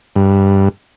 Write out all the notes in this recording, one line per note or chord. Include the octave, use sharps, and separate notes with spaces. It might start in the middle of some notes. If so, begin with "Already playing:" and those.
G2